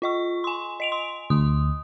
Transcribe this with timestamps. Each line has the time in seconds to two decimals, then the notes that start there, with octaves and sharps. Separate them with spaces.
0.02 F4 D#5 C#6
0.44 G#5 C6
0.80 D#5 D7 F7
0.92 C6
1.30 D2 D#6